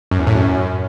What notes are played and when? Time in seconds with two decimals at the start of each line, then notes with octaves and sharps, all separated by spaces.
0.11 F#2
0.19 E2
0.27 A2
0.35 F#2